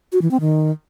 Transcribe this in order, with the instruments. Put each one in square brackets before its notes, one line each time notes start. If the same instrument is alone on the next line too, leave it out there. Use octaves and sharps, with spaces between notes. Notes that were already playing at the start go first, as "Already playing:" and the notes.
[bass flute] F#4
E3
C4
D#3